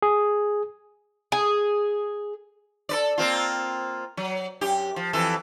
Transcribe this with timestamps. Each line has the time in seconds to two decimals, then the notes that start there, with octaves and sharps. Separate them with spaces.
0.02 G#4
1.32 G#4
2.89 A4 B4 D5
3.18 A#3 C4 F4
4.17 F#3
4.61 F#2 G4
4.96 F3
5.13 F2 E3 A4